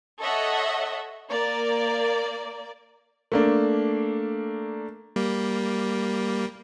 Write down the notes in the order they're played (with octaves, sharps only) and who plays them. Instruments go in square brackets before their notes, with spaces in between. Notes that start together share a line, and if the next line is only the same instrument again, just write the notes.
[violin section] A4 C#5 D#5 E5 F#5
A#3 D5
[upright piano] A3 A#3 D4
[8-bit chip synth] G3 A#3